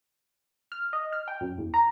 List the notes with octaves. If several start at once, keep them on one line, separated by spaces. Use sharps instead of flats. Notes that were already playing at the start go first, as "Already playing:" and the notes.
F6
D#5
F6
G5
F#2
E2
A#5